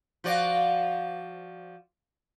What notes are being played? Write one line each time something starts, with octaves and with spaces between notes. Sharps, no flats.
F3 F#4 D5